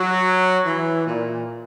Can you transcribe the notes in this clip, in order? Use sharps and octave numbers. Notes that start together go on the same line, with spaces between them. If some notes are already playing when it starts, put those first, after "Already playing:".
Already playing: F#3
E3
A#2